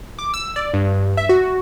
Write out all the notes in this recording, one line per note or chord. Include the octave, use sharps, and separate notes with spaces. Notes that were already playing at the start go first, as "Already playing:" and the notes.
D6
E6
D5
G2
E5
F#4